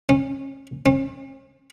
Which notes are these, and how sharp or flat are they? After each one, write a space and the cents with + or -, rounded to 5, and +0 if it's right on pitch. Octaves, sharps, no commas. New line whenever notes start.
C#4 -25
C#4 -45